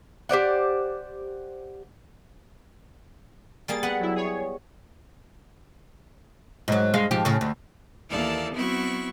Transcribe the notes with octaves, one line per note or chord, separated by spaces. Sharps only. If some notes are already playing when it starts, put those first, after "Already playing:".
G4 C5 D5 F#5
G3 A#3 G#4 A6
B3 F#5
F#3 E4
G#4 C#5
G#2 F#3
G2 G#3 F5
G#2 F3 G4
A2 C#3
D2
D#2 E3 A#3 A4 D5 A5
F#3 B3 C4 E4 F#4 C#6